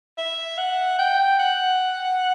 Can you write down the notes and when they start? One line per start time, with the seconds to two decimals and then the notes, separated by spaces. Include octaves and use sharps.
0.18 E5
0.58 F#5
0.98 G5
1.39 F#5